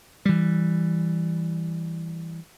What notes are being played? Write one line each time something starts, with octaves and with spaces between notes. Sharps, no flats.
E3 G3